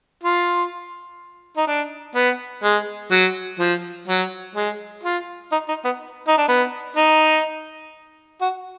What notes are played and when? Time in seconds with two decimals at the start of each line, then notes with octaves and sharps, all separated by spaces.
0.23 F4
1.57 D#4
1.67 D4
2.15 B3
2.64 G#3
3.11 F#3
3.59 F3
4.08 F#3
4.56 G#3
5.04 F4
5.52 D#4
5.69 D#4
5.85 B3
6.28 D#4
6.38 D4
6.48 B3
6.97 D#4
8.41 F#4